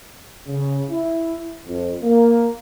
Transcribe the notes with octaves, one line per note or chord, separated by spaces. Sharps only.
C#3
E4
F2
A#3